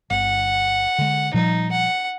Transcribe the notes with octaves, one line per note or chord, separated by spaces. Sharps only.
G1 F#5
D3 G#3
A#2 F3 G3 D#4
F#5